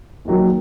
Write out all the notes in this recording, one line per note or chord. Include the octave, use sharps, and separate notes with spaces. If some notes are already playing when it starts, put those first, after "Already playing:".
D#2 D#3 F#3